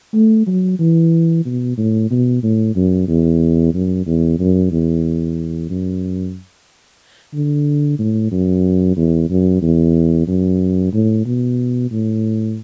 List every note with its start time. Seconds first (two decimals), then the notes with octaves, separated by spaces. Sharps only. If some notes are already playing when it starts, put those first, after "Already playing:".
0.14 A3
0.47 F#3
0.79 E3
1.45 B2
1.77 A2
2.11 B2
2.43 A2
2.76 F#2
3.08 E2
3.74 F#2
4.06 E2
4.40 F#2
4.72 E2
5.70 F#2
7.34 D3
7.99 A2
8.31 F#2
8.97 E2
9.30 F#2
9.62 E2
10.27 F#2
10.93 A2
11.26 B2
11.91 A2